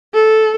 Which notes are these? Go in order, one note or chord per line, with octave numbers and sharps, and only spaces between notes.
A4